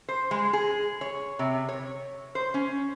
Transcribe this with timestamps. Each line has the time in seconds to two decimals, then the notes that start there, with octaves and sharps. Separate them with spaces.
0.09 C5
0.31 G#3
0.53 G#4
1.01 C#5
1.39 C3
1.69 C#5
2.35 C5
2.54 C#4